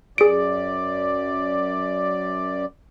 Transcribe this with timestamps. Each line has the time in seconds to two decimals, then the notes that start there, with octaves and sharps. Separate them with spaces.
0.18 F#2 G#4 D5 D7